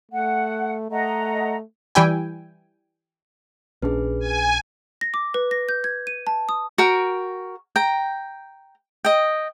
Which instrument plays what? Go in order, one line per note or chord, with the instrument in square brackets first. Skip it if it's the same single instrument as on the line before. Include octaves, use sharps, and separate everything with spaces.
[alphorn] A3 [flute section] F#5
[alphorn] A3 [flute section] D#5 F#5 A#5
[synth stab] E3 G3 E4 G5 G#5
[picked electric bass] A#1 C#4 D4 [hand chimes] G#4 B4
[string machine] G#5
[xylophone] A#6
D6
B4
A#6
G6
G#6
D#7
A5
D#6
[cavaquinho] F#4 A#4 G5
G5 A#5
D#5 G5